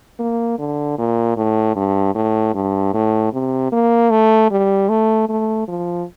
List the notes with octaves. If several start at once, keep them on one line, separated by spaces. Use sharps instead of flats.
A#3
D3
A#2
A2
G2
A2
G2
A2
C3
A#3
A3
G3
A3
A3
F3